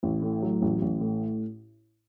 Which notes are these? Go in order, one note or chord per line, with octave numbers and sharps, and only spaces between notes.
A1
A2
F#3
A1
A1
A2